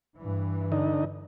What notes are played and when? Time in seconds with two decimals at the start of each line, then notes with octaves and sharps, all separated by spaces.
0.17 G2 E3
0.72 D3 D#4